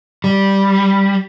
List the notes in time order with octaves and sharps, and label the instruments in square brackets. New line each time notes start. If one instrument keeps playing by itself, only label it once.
[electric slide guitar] G3